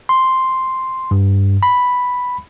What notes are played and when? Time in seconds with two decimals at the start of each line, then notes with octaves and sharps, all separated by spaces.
0.09 C6
1.11 G2
1.63 B5